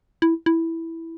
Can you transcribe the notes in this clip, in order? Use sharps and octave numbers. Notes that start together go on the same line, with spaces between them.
E4
E4